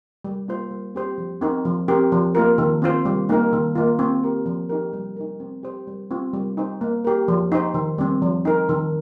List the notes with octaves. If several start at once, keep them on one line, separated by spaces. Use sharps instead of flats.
G3
A#3 F4 C5
G3
C4 G4 C5
F3
C4 D#4 A#4
F3
C4 G4 A#4
F3
A#3 F4 A#4
D#3
C4 F4 C5
G3
A#3 D#4 A#4
D#3
A#3 F4
C4
G4 A#4
F3
D#4 G4 A#4
G3
D#4 A#4
C4
G4 C5
G3
C4 F4
G3
D#4 C5
A#3
G4 A#4
F3
D#4 C5
D#3
G3 C4
F3
D#4 A#4
D#3